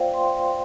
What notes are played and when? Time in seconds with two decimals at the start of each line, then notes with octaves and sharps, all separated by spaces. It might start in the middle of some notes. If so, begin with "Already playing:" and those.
Already playing: A#3 F4 C5 D5 F5 G5
0.14 G5 C6